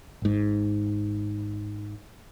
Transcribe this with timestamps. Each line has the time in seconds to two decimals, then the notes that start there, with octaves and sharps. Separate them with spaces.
0.22 G#1 G#2